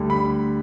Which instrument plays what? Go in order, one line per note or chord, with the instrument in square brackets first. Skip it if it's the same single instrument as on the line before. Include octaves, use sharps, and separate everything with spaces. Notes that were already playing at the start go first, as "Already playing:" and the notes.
Already playing: [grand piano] D2 D3 G3
B5